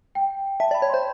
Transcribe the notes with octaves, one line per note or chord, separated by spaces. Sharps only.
G5
E5 A5
D5
B5
C#5
C5 C6